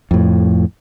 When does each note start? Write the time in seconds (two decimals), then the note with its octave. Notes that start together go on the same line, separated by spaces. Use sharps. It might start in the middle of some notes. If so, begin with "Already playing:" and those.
0.11 F2 A2